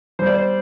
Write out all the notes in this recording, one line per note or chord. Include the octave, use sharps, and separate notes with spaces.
G3 C5
D5
C5